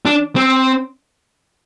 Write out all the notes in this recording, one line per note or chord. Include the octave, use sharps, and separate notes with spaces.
D4
C4